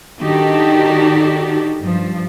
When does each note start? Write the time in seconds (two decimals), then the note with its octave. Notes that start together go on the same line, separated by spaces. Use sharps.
0.20 D#3 D4 D#4 F#4 G4 A4
1.81 G2 F3